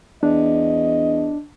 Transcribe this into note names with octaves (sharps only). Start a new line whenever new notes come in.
E2 D4 D#5